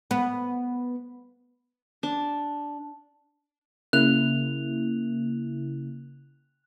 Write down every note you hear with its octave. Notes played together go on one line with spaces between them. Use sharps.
B3
D4
C#3 A#3 E4 F#6 F7